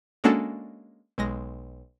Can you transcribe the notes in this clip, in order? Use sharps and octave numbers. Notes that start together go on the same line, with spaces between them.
G#3 A#3 C#4 D4 F#4 A4
B1 G#3 A#6